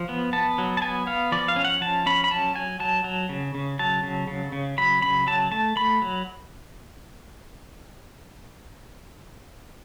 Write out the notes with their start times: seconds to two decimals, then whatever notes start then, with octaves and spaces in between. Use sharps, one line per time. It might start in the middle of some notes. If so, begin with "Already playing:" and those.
Already playing: F3
0.09 B3
0.33 B3 A5
0.58 F#3
0.77 A5
0.82 B3 G#5
1.07 B3 F5
1.32 F3 D5
1.48 F5
1.56 C#4
1.65 F#5
1.81 F3 A5
2.06 C#4 B5
2.24 B5
2.31 F#3 A5
2.55 F#3 G#5
2.80 F#3 A5
3.04 F#3
3.29 C#3
3.55 C#3
3.79 F#3 A5
4.04 C#3
4.28 C#3
4.52 C#3
4.78 F#3 B5
5.02 C#3 B5
5.27 F#3 A5
5.51 A3 A5
5.76 A3 B5
6.02 F#3